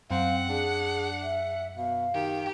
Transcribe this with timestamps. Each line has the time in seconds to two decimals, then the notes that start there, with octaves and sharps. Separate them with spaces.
0.11 F#2 C4 F5 F#5
0.49 D4 G#4
1.23 E5
1.77 B2 F5
2.14 D#3 G4